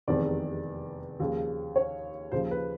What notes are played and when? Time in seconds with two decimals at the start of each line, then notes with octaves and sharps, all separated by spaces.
0.07 F1 E2 C3 D#3 G#3 D5
1.20 D#2 C#3 F3 G#3
1.76 C#5
2.32 D#2 C#3 F3 C5
2.51 B4